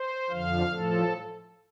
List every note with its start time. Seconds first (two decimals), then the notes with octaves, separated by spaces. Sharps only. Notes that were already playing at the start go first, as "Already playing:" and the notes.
Already playing: C5
0.29 F2 D3 F3 F5
0.71 A2 F3 A4